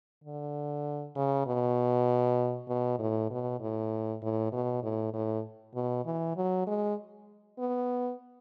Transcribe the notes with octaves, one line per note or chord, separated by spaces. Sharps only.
D3
C#3
B2
B2
A2
B2
A2
A2
B2
A2
A2
B2
E3
F#3
G#3
B3